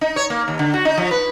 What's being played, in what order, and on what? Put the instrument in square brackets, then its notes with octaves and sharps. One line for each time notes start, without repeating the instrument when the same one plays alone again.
[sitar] D#4
C#5
A#3
D#2
D3
F#4
D#4
F3
B4